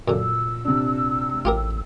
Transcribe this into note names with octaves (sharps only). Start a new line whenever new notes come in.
F#2 A#2 D3 E6
C3 D4
A1 F4 G4 A#4